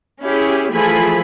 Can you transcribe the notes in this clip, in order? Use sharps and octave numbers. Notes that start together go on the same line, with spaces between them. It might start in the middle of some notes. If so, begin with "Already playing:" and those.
C#4 E4 G4 G#4
E3 F3 A3 G#4 G#5 B5